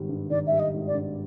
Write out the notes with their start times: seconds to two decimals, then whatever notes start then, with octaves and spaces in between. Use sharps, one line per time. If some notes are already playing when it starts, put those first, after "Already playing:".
Already playing: G#1 D#3 G3
0.09 G2
0.30 D#3 D5
0.47 E5
0.52 G3
0.59 D#5
0.73 G#1
0.87 D5
0.94 G2